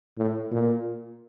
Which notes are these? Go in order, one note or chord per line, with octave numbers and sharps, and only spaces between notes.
A2
A#2